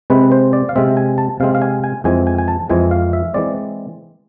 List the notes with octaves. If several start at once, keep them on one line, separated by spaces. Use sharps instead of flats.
C3 G#3 C4 B4
C5
D5
F5
C3 G#3 C4 E5
G#5
A5
C3 G#3 C4 F5
F5
G#5
G#5
F2 E3 G#3 C4 G#5
G#5
G#5
A5
F2 E3 G#3 C4 G#5
F5
E5
E3 G#3 C4 D5